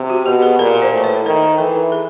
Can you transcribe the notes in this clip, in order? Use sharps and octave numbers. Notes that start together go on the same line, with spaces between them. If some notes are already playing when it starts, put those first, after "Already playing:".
Already playing: C3
F#4
B2 G4
G#4
A#2 A#4
C5
A2
C5
B4
D#3 A#4
E3 A4
G#4